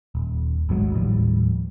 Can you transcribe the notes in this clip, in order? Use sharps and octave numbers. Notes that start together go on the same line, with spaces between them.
D#1
G#1 D2 F#3 G#3
D#2 A2 F3 G3